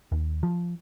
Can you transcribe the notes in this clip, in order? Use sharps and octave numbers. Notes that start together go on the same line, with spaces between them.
D#2
F3